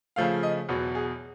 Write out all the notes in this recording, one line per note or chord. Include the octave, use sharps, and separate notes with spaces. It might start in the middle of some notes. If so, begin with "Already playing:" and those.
C#3 F3 A3 F5
D#5
E2 B2 F#3 B3
G#4